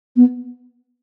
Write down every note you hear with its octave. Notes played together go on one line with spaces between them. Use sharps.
B3